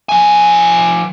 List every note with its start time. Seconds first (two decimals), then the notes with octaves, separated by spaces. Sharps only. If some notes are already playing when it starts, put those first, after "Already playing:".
0.09 F3 G#5